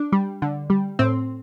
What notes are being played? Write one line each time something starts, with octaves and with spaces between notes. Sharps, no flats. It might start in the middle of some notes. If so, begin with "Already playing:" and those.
Already playing: D4
G3
D3
G3
A2 C4